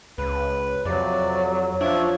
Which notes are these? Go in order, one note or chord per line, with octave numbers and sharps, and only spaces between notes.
C#2 B4
F2 C3 F#3 D5
F3 D4 C#5 E5